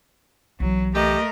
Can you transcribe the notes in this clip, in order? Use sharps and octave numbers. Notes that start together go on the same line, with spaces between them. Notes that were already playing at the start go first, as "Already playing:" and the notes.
B1 E3 F#3
A3 G4 A#4 D#5